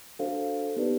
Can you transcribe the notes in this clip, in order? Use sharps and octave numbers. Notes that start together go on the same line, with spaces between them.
D4 F#4 A4 C5 F5
B3 D#4 G4 B4 D5